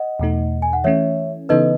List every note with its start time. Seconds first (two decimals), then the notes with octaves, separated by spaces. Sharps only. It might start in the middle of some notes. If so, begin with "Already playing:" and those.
Already playing: D#5 F#5
0.20 E2 B2 A3 D#4
0.62 G#5
0.73 F#5
0.84 E3 A3 C#4 C#5 E5
1.49 C#3 E3 B3 D#4 A4 B4 D#5